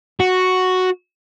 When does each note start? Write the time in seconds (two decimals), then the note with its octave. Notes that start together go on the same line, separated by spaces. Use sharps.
0.20 F#4